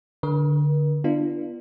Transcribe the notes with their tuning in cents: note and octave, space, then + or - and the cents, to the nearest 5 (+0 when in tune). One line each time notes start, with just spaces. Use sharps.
D3 +0 A#4 +45
B3 -15 D4 +20 F4 -30